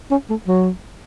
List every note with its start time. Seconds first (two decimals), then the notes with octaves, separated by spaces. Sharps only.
0.11 C#4
0.29 A3
0.47 F#3